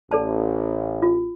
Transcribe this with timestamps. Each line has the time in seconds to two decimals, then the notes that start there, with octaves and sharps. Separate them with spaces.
0.11 A1 A4 D5 A5
1.02 F4